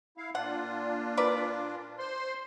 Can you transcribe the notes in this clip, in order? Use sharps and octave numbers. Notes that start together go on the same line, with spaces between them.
E4 F5
A#2 D4 F4 F#5
A#4 B4 D5
C5 C6